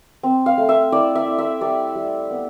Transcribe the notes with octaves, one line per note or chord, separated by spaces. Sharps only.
C4
F5
A3
E5
E4 D5
E5
E4
E5
G3 D5
G3
B3